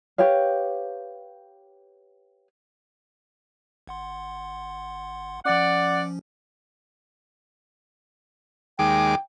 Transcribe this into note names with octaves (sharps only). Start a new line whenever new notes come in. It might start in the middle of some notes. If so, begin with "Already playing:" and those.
G4 B4 C#5 F5
G#1 F#5 C6
F3 C#4 D5 F#5
D#2 G#3 G5 D6